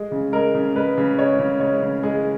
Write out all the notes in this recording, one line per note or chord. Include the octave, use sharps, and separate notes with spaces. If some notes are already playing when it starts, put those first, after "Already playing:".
Already playing: G#3 G#4
C#3
G#3 A#4
C#3
G#3 B4
C#3
G#3 C#5
C#3
G#3 C#5
C#3
G#3 G#4